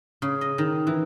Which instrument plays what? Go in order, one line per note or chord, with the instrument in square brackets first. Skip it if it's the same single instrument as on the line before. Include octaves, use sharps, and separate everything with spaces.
[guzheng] C#3
D#5
D#3
E3